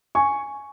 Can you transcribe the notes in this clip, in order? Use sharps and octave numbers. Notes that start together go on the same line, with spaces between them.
G#5 C#6